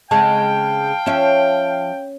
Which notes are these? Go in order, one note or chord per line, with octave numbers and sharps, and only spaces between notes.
C#3 G#3 C4 F5 G5 A5
F3 C#4 E5